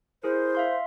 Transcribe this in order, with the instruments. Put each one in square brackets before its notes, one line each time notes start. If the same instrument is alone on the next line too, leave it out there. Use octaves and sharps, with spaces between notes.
[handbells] E4 G#4 A#4 [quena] C5
[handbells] E5 F5 C6